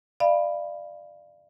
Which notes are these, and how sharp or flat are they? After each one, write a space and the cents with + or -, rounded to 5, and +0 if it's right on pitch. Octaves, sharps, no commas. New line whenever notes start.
D5 +30 F5 -25 B5 +0